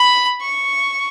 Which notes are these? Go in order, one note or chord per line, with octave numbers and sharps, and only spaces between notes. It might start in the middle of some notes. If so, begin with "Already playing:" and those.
Already playing: B5
C#6